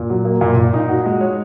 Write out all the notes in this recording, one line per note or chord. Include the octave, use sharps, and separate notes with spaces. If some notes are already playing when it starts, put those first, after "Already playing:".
Already playing: A#2
F#3
A#3
A#2
A#2
D#4
F#4
G#3
C#5